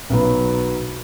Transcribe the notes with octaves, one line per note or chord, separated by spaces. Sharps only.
B1 B2 F#3 B3